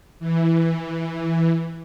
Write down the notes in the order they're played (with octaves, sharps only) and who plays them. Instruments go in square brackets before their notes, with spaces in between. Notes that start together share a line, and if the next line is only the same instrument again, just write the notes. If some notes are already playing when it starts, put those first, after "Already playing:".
[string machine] E3